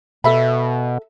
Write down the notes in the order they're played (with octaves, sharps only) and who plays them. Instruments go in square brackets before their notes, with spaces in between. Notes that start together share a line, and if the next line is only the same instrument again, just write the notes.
[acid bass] B2 [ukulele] A4 E5 B5